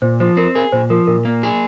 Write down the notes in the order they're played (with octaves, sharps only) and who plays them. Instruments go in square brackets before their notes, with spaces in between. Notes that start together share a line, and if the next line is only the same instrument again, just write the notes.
[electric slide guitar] A#2 [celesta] C5
[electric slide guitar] F3 [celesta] C5
[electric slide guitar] C4 [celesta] A#4
[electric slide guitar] G#4 [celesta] A#4
[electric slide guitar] A#2 [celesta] C5
[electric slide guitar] F3 [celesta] A#4
[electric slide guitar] A#2 [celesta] A#4
[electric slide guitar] A#3
G#4